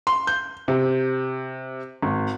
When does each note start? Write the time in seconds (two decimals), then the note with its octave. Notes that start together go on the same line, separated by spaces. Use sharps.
0.07 C6
0.27 G6
0.68 C3
2.02 G#1